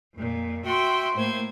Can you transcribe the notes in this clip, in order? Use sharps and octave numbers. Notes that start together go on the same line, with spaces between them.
F2 A#2
F#4 E5 G5 C6
A2 A#3 C5 G#6